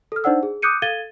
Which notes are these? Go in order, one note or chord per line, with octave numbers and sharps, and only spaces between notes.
A4 F6
D4 D#4 C5 D5 F#5 E6
G#4
D6 D#6 F#6 G6 C#7 D#7
A4 F5 G#6 A6 D#7 G7